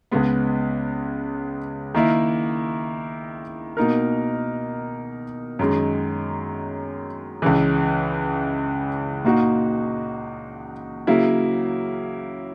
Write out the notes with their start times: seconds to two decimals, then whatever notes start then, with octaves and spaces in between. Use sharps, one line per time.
0.11 C#2 C#3 G#3 B3
1.94 D#3 A#3 E4
3.77 B2 A#3 D#4 A#4
5.59 F#2 D#3 G#3
7.42 C#2 C#3 E3
9.25 A#2 A#3 D#4 F#4
11.07 C#3 F#3 A#3 E4